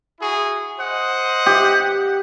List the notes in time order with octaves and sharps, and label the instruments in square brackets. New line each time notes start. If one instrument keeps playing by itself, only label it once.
[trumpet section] E4 F#4 G#4
C5 D#5 F#5
[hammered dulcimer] G4